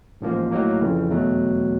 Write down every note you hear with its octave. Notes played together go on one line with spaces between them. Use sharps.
A1 G#2 F3 A#3
A2 F#3 A#3 D#4
F2 C#3 E3
E2 B2 F#3 A3